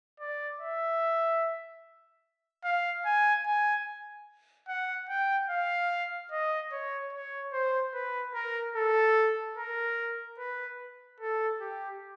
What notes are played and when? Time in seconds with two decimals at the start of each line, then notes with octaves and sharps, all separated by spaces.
0.20 D5
0.61 E5
2.65 F5
3.05 G#5
3.47 G#5
4.68 F#5
5.09 G5
5.50 F5
6.32 D#5
6.72 C#5
7.13 C#5
7.53 C5
7.94 B4
8.34 A#4
8.76 A4
9.58 A#4
10.39 B4
11.21 A4
11.61 G4